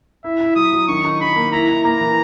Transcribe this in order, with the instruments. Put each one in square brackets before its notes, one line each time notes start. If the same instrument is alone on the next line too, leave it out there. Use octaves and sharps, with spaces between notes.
[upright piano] E4 [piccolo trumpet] E5
[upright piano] E4
[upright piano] F#3 [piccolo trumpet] D#6
[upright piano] F#3
[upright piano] D#3 [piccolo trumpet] C#6
[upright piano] D#4
[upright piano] D#3 [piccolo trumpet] B5
[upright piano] A#3
[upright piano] E4 [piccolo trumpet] A#5
[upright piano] E4
[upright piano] A#3 [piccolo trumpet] A#5
[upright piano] E3